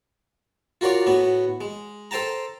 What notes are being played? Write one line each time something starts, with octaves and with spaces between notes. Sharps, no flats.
F4 F#4 A#4 C#5 D5
A2 B3 F#4
G#3
A4 C5 G5 A5 A#5